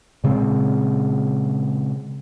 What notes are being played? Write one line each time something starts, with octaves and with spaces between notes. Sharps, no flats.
A#2 C#3 G#3 C4